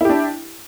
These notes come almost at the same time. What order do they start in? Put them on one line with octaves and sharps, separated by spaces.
E4 G4 D4